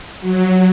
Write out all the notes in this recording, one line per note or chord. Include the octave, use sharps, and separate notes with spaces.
F#3